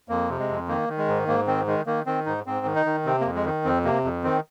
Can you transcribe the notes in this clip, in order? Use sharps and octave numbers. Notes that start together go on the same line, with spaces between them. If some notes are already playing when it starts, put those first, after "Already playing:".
F2 A#3
C3
G#3
F2
D#3 A#3
D#3
G#3
G#2
G#2 A#3
D#3 C4
D#3 G#3
D#3 A#3
D#3 C4
G#2 D#4
G#2 C4
D#3
D#4
D#3
C3 C4
F2 A#3
G#3
D#3
F2 C4
C3 A#3
F2
D#3 C4